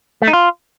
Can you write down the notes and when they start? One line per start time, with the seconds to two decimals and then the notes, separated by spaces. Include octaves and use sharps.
0.22 A3
0.28 D#4
0.33 F4